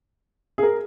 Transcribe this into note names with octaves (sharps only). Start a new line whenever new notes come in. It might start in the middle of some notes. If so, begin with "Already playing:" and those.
G#4
A#4